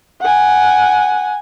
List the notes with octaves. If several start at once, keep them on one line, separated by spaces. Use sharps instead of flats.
F#5 G#5